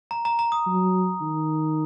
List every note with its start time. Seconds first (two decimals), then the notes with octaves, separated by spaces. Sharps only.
0.11 A#5
0.25 A#5
0.39 A#5
0.52 D#6
0.67 F#3
1.21 D#3